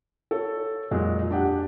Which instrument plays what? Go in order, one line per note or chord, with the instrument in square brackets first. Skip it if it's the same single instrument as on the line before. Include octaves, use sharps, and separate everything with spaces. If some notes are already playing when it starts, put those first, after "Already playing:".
[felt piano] A4 C#5
[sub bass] F2 [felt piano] A#2 F#3 G#3
[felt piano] D4 G4 F#5